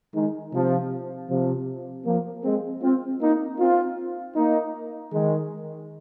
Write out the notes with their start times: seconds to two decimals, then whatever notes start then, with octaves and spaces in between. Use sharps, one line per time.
0.15 D#3 G#3
0.54 C3 F3
1.30 C3 F3
2.06 F3 A#3
2.44 G#3 C4
2.82 C4 F4
3.22 A#3 D#4
3.59 C4 F4
4.36 A#3 D#4
5.13 D#3 G#3